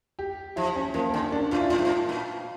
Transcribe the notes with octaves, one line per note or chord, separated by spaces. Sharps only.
G4
F3 E4
C#4
F3 A#3
A#3
D3 C#4
D4
A#2 F4
E4
A2 F4
G2
A2
A#2